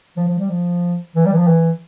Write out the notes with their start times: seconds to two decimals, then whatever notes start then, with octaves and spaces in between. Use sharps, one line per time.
0.17 F3
0.28 F3
0.39 G3
0.50 F3
1.15 E3
1.26 G3
1.33 E3
1.38 F3
1.48 E3